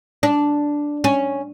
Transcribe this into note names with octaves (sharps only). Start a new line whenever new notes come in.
D4
C#4